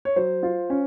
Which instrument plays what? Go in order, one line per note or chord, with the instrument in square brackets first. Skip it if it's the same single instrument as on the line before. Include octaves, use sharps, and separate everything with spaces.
[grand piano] C#5
[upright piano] F#3 [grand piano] C5
[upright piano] F4
C#4